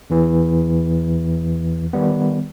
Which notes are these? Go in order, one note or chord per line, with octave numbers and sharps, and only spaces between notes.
E2 E3
D#3 G3 B3